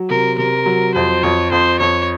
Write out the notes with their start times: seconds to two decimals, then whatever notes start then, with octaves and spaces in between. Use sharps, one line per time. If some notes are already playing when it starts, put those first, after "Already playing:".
Already playing: F#3
0.09 C3 A#4
0.38 C3 A#4
0.66 F#3
0.95 F2 C5
1.23 F2 C#5
1.52 F2 C5
1.80 F2 C#5